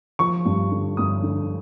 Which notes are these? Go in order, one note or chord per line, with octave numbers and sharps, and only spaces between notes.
F3 C#6
G2
D3
G2 D#6
D3